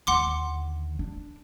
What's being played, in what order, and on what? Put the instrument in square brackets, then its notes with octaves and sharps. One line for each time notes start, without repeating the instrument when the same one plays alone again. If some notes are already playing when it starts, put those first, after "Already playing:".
[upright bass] D#2 D3 [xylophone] F#5 C6 D6
[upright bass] D4